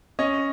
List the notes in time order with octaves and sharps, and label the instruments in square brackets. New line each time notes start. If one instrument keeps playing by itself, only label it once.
[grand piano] C#4 D#5